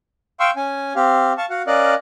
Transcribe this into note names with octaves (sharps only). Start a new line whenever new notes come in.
F5 G5 C6 C#6 E6
C#4 G#5
C4 G4 F5
F5 A5 C#6
F#4 F5 F#5
C#4 A#4 D5 D#5 F5 F#6